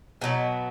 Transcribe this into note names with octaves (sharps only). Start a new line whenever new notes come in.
B2 F#3 B3 D#4